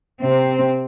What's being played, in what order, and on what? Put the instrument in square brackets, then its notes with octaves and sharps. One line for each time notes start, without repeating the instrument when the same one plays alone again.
[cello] C3 C4